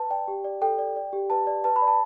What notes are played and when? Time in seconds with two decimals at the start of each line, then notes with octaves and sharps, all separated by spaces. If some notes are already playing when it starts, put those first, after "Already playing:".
Already playing: B4 A5
0.10 D5 G5
0.28 G4
0.44 D5
0.62 A4 G5
0.78 D5
0.96 D5
1.13 G4
1.30 B4 A5
1.47 D5
1.64 B4 A5
1.76 B5
1.82 D5
1.88 A5